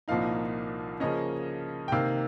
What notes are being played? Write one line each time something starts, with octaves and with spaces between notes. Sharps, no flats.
C2 A#2 F3 A#3 D#4 F5
C#3 F3 A#3 C#4 D#5
G5
C3 D#3 A#3 F5